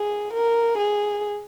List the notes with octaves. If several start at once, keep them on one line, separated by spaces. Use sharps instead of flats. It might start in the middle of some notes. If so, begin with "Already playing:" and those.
Already playing: G#4
A#4
G#4